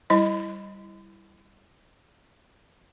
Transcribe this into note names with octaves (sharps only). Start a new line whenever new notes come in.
G3 E4 D#5